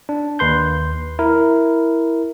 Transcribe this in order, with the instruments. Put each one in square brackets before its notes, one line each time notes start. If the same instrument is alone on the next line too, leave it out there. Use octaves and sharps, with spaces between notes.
[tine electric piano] D4
D#2 B4 C6 G6
E4 A#4